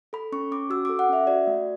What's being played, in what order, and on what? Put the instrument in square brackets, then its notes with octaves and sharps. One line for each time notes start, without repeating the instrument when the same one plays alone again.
[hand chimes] A4 B5
C#4 C#6
C#4 D6
F#4 E6
A4 D6
F#5
C#4 E5
F#4 D5
A3